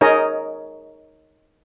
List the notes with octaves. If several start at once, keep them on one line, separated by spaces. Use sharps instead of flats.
D#4 G#4 A#4 C#5 D#5